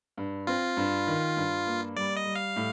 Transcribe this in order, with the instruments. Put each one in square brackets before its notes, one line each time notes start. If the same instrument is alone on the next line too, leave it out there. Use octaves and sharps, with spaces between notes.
[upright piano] G2
[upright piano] C4 [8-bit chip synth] F4
[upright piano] G2
D#3
G2
A#3
[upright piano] G3 [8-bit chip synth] D5
[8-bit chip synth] D#5
[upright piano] G3
[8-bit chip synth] F5
[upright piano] A2